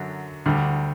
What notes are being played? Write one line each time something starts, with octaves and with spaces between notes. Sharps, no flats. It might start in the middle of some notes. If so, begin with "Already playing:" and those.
Already playing: F#2 D3 F#3
D2 D3 G3